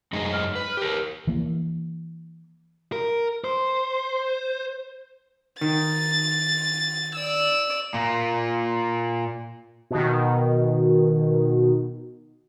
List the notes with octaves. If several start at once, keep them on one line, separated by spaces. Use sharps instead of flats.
F#2 G#3 D#4
F6
B4
G4 A#4
E3 A#3
A#4
C5
D#3 A6
D5 E6
A#2 A#3
B2 D#3